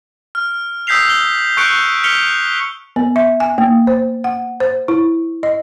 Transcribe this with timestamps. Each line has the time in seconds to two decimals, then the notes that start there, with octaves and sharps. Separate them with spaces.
0.35 F6
0.87 D#6 E6 G6 B6 C7 F7
1.10 G7
1.57 C#6 F#6 G6 C#7 D7
2.03 F6 B6 C#7 F7 G7
2.96 B3
3.16 E5
3.40 G#5
3.58 A#3
3.87 C5
4.24 F#5
4.60 C5
4.88 E4
5.43 D#5